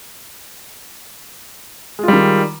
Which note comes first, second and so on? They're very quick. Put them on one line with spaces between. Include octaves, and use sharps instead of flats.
G#3 F4 G3 D#3